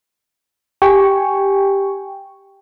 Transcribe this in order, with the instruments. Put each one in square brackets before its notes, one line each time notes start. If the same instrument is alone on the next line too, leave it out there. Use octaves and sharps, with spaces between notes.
[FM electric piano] G4 G5 G#5 C#6